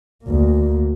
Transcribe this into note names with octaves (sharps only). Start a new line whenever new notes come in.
D2 A#3